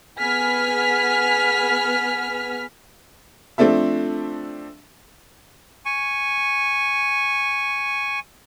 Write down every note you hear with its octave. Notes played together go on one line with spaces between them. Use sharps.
B3 G#4 G#5 F6 B6
F3 A3 C4 D4 A4 E5
G#5 C#6